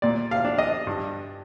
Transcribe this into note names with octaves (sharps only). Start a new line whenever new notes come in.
A#2 D5
F5
D4
D#5
G2